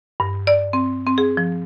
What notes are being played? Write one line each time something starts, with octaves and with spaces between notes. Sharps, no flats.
G2
D5
C4
C4
G#4
F3